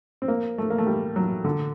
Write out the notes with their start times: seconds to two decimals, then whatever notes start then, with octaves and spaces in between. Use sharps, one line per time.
0.22 C4
0.28 A#3
0.58 A3
0.70 A#3
0.78 A3
0.87 G3
1.16 F#3
1.44 D3